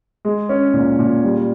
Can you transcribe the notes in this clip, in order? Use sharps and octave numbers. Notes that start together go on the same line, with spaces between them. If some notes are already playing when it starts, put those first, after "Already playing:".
G#3
C#4
A#2
A#2
G3